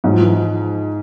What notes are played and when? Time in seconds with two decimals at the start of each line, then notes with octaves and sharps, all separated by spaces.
0.04 G#2 F#3
0.12 F3
0.20 E3
0.28 F3